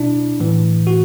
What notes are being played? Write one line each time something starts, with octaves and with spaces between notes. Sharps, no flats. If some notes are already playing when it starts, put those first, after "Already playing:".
Already playing: B2 D4 E4
A2 E3
F#4